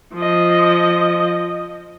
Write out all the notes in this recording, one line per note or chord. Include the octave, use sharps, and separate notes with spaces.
F3 D#5